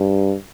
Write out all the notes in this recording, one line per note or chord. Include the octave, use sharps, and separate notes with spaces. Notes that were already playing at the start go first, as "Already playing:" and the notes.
Already playing: G2